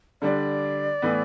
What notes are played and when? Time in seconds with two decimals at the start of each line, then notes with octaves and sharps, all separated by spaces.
0.22 D3 G3 D4 D5
1.02 A2 E3 B3